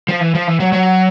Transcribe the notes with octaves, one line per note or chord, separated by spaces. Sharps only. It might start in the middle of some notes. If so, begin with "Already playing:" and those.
F3
E3
F3
E3
F#3
F#3